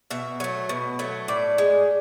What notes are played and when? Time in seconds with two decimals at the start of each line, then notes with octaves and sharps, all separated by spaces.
0.11 B2 E5
0.40 F#3 A3
0.69 B2
0.99 F#3 A3
1.28 A2 D5
1.58 G#3